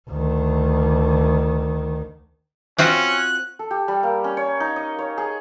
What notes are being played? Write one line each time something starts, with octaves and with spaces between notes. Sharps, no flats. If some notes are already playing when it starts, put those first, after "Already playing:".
D2 D#3
C4 C#4 F4 F#4 F#6
A4
G4
G3
A#3
C#4
C#5
D#4
D#5
C#5
G#4